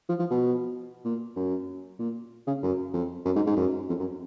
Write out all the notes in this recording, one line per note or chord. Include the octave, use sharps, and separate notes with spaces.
F3
F3
B2
A#2
F#2
A#2
C#3
F#2
F2
F#2
G#2
G#2
F#2
F2
F#2